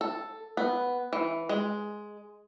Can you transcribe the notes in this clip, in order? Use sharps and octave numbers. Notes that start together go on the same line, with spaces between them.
A4
B3
E3
G#3